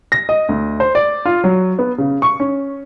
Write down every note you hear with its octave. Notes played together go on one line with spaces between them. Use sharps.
A#6
D#5
D2
C5
D5
F4
F#3
B3
C#3
C#6
C#4